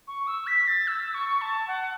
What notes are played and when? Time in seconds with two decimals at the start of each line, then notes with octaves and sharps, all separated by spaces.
0.08 C#6
0.27 E6
0.47 B6
0.67 A6
0.88 E6
1.14 C#6
1.41 A5
1.68 F#5